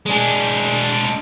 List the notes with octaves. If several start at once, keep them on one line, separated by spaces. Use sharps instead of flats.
G#3 D4 G#4 D5 G#5